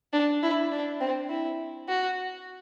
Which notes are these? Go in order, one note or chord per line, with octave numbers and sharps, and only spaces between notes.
D4
E4
D4
C4
E4
F#4